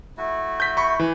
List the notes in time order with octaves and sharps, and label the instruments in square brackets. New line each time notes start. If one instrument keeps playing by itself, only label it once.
[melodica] A3 E4 F#4
[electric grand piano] G6 B6
B5 C#6
E3